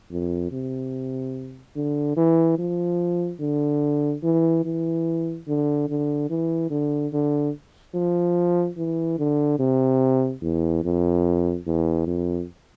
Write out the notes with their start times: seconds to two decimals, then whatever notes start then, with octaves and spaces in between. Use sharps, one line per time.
0.11 F2
0.52 C3
1.76 D3
2.17 E3
2.59 F3
3.40 D3
4.23 E3
4.65 E3
5.48 D3
5.89 D3
6.30 E3
6.70 D3
7.13 D3
7.95 F3
8.77 E3
9.19 D3
9.59 C3
10.42 E2
10.84 F2
11.67 E2
12.07 F2